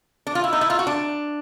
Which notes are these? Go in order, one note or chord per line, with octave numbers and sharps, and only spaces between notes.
D4
F4
E4
D#4
E4
F4
F#4
D4